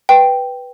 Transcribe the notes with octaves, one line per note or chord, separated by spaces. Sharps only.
B4 G5